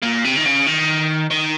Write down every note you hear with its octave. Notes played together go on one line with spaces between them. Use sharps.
A#2
C3
D#3
C#3
D#3
D#3